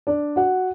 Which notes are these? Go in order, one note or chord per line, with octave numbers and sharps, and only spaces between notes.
D4 D5
F#4 F#5